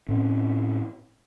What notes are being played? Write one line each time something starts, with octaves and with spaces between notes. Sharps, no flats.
A2 C4 C#4